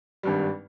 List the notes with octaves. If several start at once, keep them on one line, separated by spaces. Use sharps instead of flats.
G#1 G2 G3